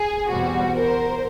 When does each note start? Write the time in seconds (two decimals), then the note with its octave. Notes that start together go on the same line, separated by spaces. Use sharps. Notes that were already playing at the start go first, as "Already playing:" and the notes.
Already playing: G#4
0.28 E2 B2 G3 C4 F#4
0.74 A#4 C5